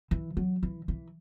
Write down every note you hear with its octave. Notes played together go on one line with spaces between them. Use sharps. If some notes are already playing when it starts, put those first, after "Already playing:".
E3
F#3
E3
E3